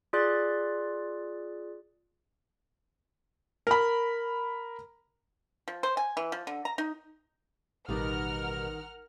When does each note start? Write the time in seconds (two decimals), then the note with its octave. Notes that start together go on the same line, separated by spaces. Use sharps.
0.13 F4 G#4 D5 C6 F#6 A6
3.67 A#4 B5
5.68 F3
5.83 C5
5.97 G#5
6.17 E3
6.32 F3
6.47 D3
6.65 A#5
6.78 D#4
7.89 A1 B2 D#3 G3 D#4 A#4 F#5 F6